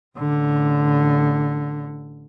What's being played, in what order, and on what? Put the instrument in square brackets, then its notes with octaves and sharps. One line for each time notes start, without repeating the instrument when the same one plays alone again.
[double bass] A1 D3